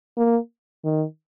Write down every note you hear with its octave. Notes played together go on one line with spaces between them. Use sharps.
A#3
D#3